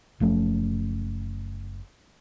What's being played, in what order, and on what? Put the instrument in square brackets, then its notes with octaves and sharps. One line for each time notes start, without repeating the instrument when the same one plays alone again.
[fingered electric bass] F#1 F3 A3 C#4